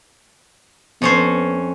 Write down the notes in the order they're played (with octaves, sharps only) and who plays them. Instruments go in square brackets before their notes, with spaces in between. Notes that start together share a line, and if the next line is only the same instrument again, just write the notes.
[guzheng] F2 C#4 C5 [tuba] B3